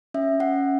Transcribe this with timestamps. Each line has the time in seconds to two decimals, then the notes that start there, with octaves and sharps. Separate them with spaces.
0.14 C#4 E5
0.40 C#4 F#5